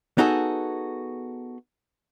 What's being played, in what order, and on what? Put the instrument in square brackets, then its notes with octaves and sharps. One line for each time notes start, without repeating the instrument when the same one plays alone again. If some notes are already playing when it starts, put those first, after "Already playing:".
[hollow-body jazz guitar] B3 D#4 F#4 G#4 A4